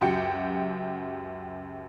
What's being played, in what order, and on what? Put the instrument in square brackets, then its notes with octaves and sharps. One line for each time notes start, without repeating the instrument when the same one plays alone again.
[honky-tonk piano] C#2 F#2 F#4 G4 G5 C#7